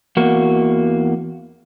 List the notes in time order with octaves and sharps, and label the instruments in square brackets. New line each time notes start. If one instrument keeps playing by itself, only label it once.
[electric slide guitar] E2 A#3 F#4